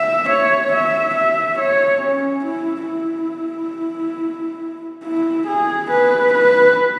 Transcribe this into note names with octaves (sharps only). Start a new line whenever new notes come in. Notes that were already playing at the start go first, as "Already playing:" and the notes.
Already playing: E5
C#5
E5
E5
C#5
C#4
E4
E4
E4
G#4
B4
B4